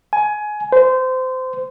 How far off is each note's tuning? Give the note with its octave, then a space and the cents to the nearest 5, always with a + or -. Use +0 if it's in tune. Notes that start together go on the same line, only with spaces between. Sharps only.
G#5 +20
C5 -25